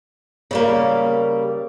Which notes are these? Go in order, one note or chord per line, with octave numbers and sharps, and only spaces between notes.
C#3 G3 A#3